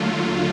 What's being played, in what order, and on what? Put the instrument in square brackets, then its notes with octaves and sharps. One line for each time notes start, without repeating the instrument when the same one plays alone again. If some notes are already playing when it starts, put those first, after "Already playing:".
Already playing: [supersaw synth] D#2 D3 F#3 A3 F4